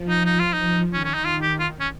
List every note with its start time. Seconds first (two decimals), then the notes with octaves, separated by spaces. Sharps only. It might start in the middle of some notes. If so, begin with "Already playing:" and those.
Already playing: F3
0.09 D#4
0.25 D#4
0.39 F4
0.53 D#4
0.59 F3
0.93 D#3 C#4
1.04 C#4
1.14 D#4
1.25 F4
1.42 G4
1.59 F4
1.80 C#4